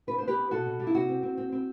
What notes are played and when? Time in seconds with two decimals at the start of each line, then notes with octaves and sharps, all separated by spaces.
0.07 D4 B4
0.18 B3 C5
0.27 G4 B4
0.37 B3
0.51 B2 F#4 A4
0.65 B2
0.80 G3
0.87 E4
0.95 C3 F#4
1.09 C4
1.23 C4
1.38 C4
1.52 C4